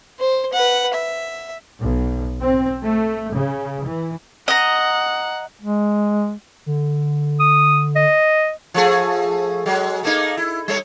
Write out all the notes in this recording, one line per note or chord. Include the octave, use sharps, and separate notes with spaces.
C5
B4 F#5
E5
B1
C4
A3
C#3
E3
D#5 F#5 A#5
G#3
D3
D#6
D#5
F3 A3 G#4
F#3 G#3
A3 A#3 D#4
E4
G3 A3 C#5